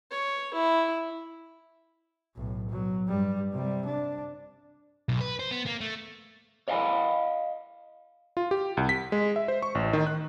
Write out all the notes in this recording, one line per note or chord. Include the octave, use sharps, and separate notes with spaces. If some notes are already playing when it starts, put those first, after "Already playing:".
C#5
E4
B1 A2
B2 F#3
G2 G3
C3 G3
D4
B1
B4
C5
B3
A#3
A3
C#5 D#5 F5 G5 G#5 B5
F4
G4
C2
B6
G#3
E5
C5
C#6
A1
D#3
F#6